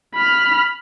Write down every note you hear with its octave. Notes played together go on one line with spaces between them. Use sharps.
B5 F6